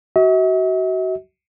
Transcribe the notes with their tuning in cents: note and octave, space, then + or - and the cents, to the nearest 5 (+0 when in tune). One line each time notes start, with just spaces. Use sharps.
F#4 +25 E5 -45